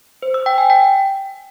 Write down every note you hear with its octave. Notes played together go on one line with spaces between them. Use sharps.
C5
E6
G5
G#5
G5